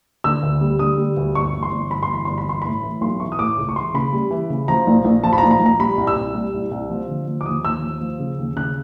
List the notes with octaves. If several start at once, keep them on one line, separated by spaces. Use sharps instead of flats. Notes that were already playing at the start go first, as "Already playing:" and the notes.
D3 E6
D2
G3
D3 D#6
G3
D2
G1 C#6
E3
C6
G1
G1 B5
C6
E3 B5
G1 C6
B5
E3 C6
A2 B5
E3
B1 C6
E3 C#6
D#6
A2 D6
C#2
C#6
E3 C6
C#3 B5
G3
E3
C#3
F3 A#5
A#1
A#1
F3 A5
B5
A#5
A#1
A#5
A#1
A#5
G3 B5
C2
E6
C2
G3
C2
C2
F3
D3
F3
D6
D#2 D#6
D#2 E6
F3
F3
C#3
D#2
C#3 F#6